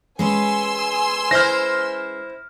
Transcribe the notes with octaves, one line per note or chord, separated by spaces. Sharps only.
G#3 C#4 B4 G#5 C6 E6
E4 C5 E5 F6 A#6